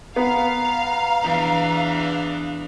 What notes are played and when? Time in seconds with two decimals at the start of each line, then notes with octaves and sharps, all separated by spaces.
0.16 B3 F5 A#5
1.22 E2 E3 D4